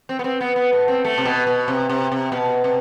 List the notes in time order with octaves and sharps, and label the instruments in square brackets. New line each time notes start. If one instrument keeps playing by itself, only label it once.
[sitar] C4
B3
C4
B3
B3
A3
C4
A3
C3
B2
B2
C3
C3
C3
B2
C3